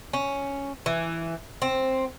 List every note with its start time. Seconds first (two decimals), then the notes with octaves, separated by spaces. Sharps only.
0.13 C#4
0.86 E3
1.62 C4